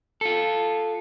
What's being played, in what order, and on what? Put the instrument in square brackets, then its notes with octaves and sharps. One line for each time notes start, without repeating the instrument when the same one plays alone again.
[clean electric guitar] F4 A4